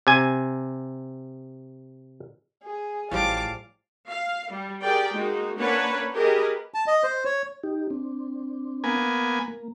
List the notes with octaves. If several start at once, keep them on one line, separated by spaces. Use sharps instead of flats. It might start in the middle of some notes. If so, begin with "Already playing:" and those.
C3 G#5
G#4
A1 A2 F3 G3 F5 A5 D6
F5
G3
G4 G#4 A#4 D5 G5
G#3 A#3 D#4 F#4
A#3 C#4 D4 B4 C#5 F#5
G4 G#4 A#4 B4 D#5
A5
D#5
C5
C#5
D#4 G4
C4 D4
A#3 B3 G#5
A#3